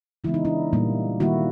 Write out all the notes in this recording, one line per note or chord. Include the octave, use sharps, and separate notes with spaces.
C#3 E3 G#3 B3 E4
D#4
D4 E4
A#2 G3 A#3
D#3 G3 A#3 E4 F#4